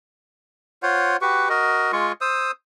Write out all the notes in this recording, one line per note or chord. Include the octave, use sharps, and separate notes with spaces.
F4 C5 C#5 F#5
F#4 G4 B4 C#6
F#4 A#4 D#5
G#3 F4 C#6
C5 D#6 E6